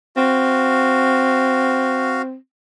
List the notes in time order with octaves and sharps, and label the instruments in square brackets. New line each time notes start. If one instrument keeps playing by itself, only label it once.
[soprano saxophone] C4 [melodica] F#4 F5